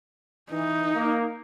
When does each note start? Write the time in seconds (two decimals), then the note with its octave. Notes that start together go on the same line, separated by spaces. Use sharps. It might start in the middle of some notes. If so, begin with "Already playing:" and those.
0.51 E3 D#4
0.95 A#3